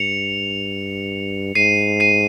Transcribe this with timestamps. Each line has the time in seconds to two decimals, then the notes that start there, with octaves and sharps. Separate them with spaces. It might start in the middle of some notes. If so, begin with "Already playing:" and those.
Already playing: G2 C#7 F7
1.55 G#2 C7 D#7
2.00 C7 D#7